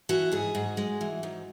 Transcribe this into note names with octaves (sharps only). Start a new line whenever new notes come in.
E3 F#4
G#2 G#4
G#2 F#4
G#3
E3
G#2